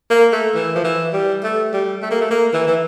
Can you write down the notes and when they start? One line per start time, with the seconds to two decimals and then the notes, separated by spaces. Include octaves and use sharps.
0.10 A#3
0.33 A3
0.55 E3
0.76 F3
0.84 E3
1.13 G3
1.43 A3
1.73 G3
2.02 A3
2.11 A#3
2.21 A3
2.31 A#3
2.53 E3
2.67 E3